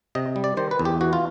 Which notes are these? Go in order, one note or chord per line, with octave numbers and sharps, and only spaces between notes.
C3 D#5
G3
D5
D#3 C5
B4
E2
G4
E3 F#4
F4